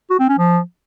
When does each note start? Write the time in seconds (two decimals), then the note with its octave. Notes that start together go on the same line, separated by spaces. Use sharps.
0.10 F#4
0.20 C4
0.29 C#4
0.38 F3